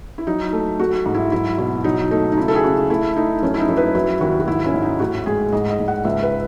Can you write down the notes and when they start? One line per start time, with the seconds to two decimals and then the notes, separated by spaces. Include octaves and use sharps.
0.18 E4
0.27 F#3 D#4
0.53 A3
0.80 A3 F#4
1.06 G#2
1.14 E4
1.32 F#3 E4
1.58 B2 E4
1.84 F#3 D#4
2.11 A3 D#4
2.32 D#4
2.37 C#3 E4
2.48 A4
2.55 G#4
2.63 C#3 F#4
2.90 A3 E4
3.16 A3 D#4
3.42 F#2 C#4
3.54 E4
3.60 D#4
3.68 F#2
3.77 B4
3.95 F#3 E4
4.21 D#2 F#4
4.40 F#4
4.47 G#2 E4
4.66 C#4
4.74 G#2
4.82 D#4
5.00 A2 F#4
5.26 G#3 G#4
5.53 G#2 D#5
5.70 D#5
5.79 G#2
5.88 F#5
6.05 C#2 E5
6.23 B4